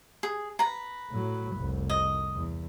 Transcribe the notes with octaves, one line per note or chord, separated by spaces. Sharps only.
G#4
B4 A#5
A2 F#3
F1 C2
D#5
E2